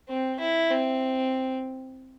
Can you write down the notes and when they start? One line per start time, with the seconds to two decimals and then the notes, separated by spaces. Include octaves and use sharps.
0.09 C4
0.40 E4
0.70 C4